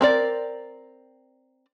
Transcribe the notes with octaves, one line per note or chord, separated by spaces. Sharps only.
C4 A#4 D5